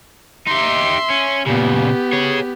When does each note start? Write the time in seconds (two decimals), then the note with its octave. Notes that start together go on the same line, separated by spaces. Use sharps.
0.47 D#4 G4 E5 C6
1.10 C#4
1.46 A#2 C#3 B3 G4
2.13 G#4 C#5